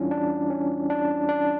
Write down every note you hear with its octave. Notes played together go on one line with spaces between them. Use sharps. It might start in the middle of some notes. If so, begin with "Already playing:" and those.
Already playing: E2 E3 G3 C#4 D4 E4 F4
D4
C#4
D4
D4